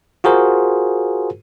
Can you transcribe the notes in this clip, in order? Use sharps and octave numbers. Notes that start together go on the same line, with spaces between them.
F4 F#4 G#4 A#4 C5